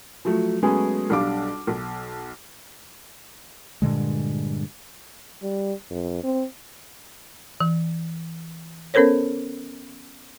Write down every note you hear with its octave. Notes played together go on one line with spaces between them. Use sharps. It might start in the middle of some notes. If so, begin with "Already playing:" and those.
F3 F#3 A3
F#3 G#3 A3 B3 C#4 G#4
B1 G3 D4 F5 D6
B1
G2 A#2 D3 G#3
G3
F2
C4
E3
B3 C#4 A4 A#4 C5 C#5